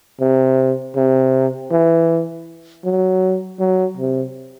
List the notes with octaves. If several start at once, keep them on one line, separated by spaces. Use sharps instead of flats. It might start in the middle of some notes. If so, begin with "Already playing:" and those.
C3
C3
E3
F#3
F#3
C3